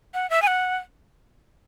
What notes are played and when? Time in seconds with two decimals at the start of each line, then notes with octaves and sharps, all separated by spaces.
0.14 F#5
0.30 E5
0.42 G#5
0.47 F#5